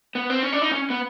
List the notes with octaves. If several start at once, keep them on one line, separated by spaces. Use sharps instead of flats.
B3
C4
C#4
D4
D#4
C#4
B3